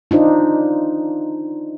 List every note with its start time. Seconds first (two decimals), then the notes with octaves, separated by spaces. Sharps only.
0.11 D4 D#4 F4 C5